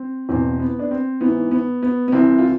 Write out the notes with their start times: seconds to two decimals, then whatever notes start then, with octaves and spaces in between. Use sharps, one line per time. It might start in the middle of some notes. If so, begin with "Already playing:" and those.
Already playing: C4
0.29 E2 B2 C4
0.59 B3
0.79 D4
0.91 C4
1.21 G#2 E3 B3
1.51 B3
1.83 B3
2.08 B3
2.12 C2 C3 E3 C4
2.38 F4